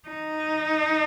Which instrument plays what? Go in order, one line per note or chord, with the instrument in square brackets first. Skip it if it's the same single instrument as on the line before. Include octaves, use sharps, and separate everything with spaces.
[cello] D#4